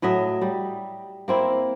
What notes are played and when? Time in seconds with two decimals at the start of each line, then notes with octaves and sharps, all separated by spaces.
0.02 A2 F#3 D#5 E5
0.42 G3
1.28 A#3 C4 E4